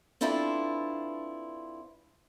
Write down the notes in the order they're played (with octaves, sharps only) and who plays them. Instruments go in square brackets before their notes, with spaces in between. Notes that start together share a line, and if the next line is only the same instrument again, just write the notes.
[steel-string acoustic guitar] C4 D4 E4 F4 A4 B4